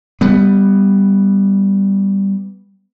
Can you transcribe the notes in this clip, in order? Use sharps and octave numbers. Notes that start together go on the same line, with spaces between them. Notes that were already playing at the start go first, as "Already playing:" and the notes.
G3 B3